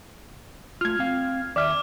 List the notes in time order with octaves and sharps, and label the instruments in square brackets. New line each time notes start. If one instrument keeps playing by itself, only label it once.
[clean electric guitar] A3 F4 [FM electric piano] F6 G#6
[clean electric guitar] C4 F5
[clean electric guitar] D#2 E5 [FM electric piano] D5 [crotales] D6 F6